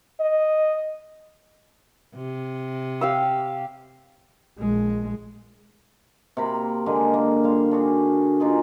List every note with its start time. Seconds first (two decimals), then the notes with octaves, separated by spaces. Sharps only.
0.20 D#5
2.15 C3
3.01 G4 F5 E6
4.59 A#1 G#3
6.37 C3 A#3 A#4 B5
6.86 D3 G#3 A#3 G#5
7.14 A#3
7.44 G3 F5 C6
7.71 D4 F#4 G#4
8.40 A#3 D#4 F4 G#4